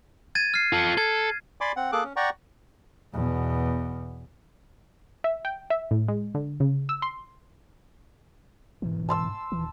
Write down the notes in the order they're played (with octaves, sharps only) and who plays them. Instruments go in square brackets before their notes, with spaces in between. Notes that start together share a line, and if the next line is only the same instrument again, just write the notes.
[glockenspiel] G#6 A6 D#7
F6 C7
[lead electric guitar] F4 A4
[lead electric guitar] A4 [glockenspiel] G#6
[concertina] D5 G#5 B5 C6 D6
C4 F#5
A#3 G#4 A4 D6 F#6
C#4
D5 F#5 G5 A#5 C#6
[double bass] E2 B2
[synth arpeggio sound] E5
G5
E5
A2
G#3
D3
C#3
E6
C6
[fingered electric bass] G1 G#2 B2 [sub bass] E3
[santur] A5 C6 E6
[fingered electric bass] D#1 [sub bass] E3